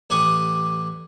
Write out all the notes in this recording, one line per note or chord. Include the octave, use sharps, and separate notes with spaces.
A1 D4 G4 G#5 C#6 D#6